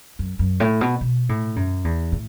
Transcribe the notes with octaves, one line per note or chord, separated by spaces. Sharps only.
F#2
F#2
A2
B2
B2
A2
F#2
E2
A2